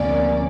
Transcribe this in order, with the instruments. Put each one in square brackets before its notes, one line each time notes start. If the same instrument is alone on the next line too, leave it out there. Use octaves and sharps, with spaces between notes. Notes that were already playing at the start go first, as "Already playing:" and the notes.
Already playing: [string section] D2 C3 F3 A#3 C#4 D5